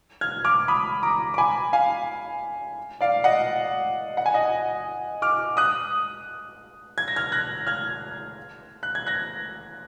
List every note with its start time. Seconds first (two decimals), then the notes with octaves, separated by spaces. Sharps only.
0.21 F6 G#6
0.45 D6 F6
0.68 B5 D#6
1.03 A#5 D6
1.34 D6
1.38 G#5 B5
1.73 F5 G#5
3.01 D5 F5
3.24 D#5 F#5
4.17 F#5
4.26 G#5
4.34 D#5 F#5
5.22 D6 F6
5.57 D#6 F#6
6.98 G#6
7.08 A#6
7.16 F6 G#6
7.32 F#6 A#6
7.67 F6 G#6
8.83 F#6
8.95 G#6
9.06 F#6 A#6